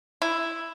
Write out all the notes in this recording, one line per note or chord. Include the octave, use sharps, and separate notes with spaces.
E4